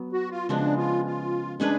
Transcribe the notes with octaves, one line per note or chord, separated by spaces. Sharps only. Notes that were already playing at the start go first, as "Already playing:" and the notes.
Already playing: F#3 B3
F#4
F4
C#3 F3 G#3 B3 D4
F4
F4
G#3 C#4 D4 G#4 B4